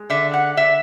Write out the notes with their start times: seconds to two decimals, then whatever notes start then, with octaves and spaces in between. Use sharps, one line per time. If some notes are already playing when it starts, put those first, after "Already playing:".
Already playing: G#3
0.10 D3 E5
0.34 F#5
0.57 D3 E5